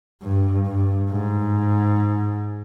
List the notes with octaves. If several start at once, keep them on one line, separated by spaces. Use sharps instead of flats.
G2
G2
G#2